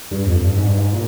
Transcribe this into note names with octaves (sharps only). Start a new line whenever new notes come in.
G2
F2
G2
G#2
G2
G#2
A#2